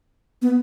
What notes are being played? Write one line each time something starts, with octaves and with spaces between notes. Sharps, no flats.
B3